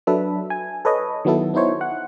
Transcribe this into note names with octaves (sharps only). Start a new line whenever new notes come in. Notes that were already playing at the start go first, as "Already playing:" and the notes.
F#3 D4 A4 B4 E5
G#5
A4 B4 C#5 D#5
D#3 F#3 B3 E4 A4
B3 D#4 E4 C5 C#5
F#5